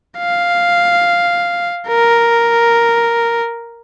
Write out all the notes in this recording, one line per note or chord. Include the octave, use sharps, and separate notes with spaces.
F5
A#4